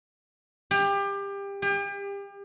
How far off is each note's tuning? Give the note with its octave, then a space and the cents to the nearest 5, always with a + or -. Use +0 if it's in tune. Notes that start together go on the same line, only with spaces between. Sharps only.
G4 +25
G4 +35